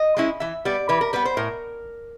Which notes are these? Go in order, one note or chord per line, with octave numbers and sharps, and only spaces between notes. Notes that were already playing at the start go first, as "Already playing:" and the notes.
Already playing: D#5
G#3 C#4 E4
E3 E5
G3 B3 D5
E3 B4
A#4
G3 B3 B4
C5
A2 A#4